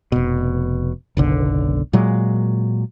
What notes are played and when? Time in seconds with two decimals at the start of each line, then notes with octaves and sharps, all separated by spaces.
0.12 F1 B2
1.17 F#1 B1 D3
1.93 A#2 F#3 G#3